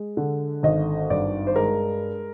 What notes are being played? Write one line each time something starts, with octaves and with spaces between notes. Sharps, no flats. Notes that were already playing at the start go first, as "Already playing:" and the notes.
Already playing: G#3
D3
G#1 D#5
G2 D5
C5
G#3 A#4